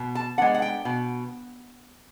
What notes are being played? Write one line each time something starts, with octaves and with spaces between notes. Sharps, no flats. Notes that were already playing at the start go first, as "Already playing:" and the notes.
Already playing: B2
A5
G#3 B3 D4 F#5
F#5
G5
B2